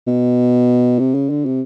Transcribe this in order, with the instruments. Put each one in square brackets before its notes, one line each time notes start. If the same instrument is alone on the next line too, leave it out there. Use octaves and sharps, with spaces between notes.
[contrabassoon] B2
C3
C#3
D3
C3